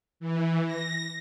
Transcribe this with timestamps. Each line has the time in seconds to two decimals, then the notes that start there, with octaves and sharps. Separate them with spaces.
0.20 E3
0.65 A#6